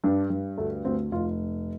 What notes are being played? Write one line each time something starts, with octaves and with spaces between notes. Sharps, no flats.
G2 D4
G2
D2 A3
D2 C4
F1 F4